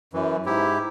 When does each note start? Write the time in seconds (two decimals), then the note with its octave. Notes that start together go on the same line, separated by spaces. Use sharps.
0.14 F#2 E3
0.46 G#2 E4 G4